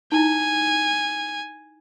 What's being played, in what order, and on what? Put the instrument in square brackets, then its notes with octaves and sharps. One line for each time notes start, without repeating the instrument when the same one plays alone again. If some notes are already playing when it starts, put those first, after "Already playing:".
[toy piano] D#4 E4 [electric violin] G#5